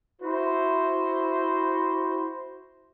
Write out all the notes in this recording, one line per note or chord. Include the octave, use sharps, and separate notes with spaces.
E4 F#4 C5